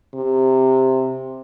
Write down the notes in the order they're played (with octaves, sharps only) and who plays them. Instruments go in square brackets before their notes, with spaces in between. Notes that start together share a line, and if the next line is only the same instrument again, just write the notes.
[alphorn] C3